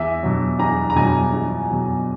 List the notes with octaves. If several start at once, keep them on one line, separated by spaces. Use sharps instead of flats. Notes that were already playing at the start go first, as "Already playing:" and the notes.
Already playing: E2 E5
B2 F#3
E2 A#5
A#5
B2 F#3 G#5
E2
B2 F#3